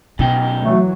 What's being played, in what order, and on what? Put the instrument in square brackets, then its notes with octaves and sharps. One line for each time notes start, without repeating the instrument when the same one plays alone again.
[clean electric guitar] F#2 D#4 G5 [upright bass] B2
[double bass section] E3 F#3 [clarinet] A3